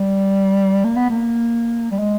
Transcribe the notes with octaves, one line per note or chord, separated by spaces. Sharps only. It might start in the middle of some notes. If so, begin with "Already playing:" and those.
Already playing: G3
A#3
B3
A#3
G3
G#3